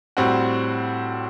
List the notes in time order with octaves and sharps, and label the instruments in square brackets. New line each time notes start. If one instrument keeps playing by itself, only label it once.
[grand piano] A2 G3 C4 F#4